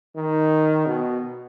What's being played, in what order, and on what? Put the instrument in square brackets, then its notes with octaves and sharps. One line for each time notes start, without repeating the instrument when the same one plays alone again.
[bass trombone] D#3
B2